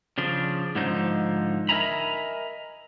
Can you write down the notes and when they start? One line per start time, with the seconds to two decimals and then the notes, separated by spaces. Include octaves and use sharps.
0.18 C#3 F3 D4
0.75 G#2 D3 F3 D#4
1.69 A#4 D#5 E5 G#5 A#5 B5